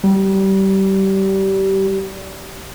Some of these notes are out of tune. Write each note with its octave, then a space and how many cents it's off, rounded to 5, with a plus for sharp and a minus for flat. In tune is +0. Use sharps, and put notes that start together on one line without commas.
G3 -25